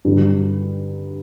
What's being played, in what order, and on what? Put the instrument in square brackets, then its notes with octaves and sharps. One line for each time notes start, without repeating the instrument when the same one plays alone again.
[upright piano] G2 D3 F#3